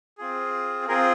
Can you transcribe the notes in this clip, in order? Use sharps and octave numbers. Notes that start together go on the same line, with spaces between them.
C4 F4 G#4
C4 F4 G#4 A#4